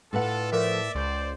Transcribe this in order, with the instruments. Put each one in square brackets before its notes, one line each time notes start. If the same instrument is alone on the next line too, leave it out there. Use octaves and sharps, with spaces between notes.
[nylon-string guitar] A2 B4 F#5 [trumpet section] D4 F4 A4
[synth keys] F3 A3 [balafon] A#4 [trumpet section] D5 E5
[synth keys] C#2 [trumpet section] C5 D5